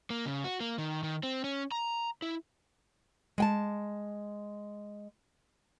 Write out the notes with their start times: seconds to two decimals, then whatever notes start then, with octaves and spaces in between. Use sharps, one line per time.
0.10 A#3
0.26 C#3
0.44 F#4
0.60 A#3
0.78 D#3
1.03 D#3
1.23 C4
1.44 C#4
1.71 A#5
2.22 E4
3.38 G#3 G5 A5